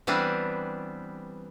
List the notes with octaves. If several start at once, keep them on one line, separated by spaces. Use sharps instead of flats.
E3 G3 B3 C4 D4